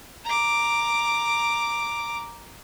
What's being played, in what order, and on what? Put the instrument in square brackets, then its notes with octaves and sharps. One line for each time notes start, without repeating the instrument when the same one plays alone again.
[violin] A#5 D6